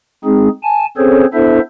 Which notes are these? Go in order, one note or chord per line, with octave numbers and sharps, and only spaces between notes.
G#3 C4 D#4 G#4
G#5 A5
C4 C#4 G#4 A4 C5 C#5
B3 D4 E4 A4 C5 E5